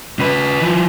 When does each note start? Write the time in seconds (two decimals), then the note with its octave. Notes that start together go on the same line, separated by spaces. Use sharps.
0.19 C#3 B4
0.62 E3 F3